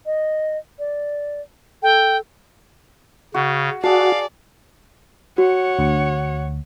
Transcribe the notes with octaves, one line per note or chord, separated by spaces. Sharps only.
D#5
D5
A4 G5
C#3 F#4
F#4 G#4 D5 F5 A5
F#4 C#5 F#5
D2